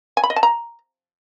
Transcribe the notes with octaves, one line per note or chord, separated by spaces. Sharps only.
G#5
B5
D#5
A5
A#5